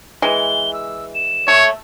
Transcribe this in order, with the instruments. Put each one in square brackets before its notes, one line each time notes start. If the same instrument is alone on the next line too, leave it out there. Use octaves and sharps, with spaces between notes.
[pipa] E3 G#3 [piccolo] G7
[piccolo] E6
E7
[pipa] A3 [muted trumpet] C#5